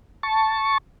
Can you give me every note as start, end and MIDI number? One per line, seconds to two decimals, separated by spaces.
0.23 0.78 81
0.23 0.78 85